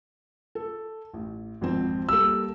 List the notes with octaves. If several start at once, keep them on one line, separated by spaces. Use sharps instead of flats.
A4
A1
G#1 F2 C4
G3 A#3 A4 E6